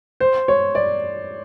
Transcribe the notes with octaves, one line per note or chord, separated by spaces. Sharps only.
C5
C#5
D5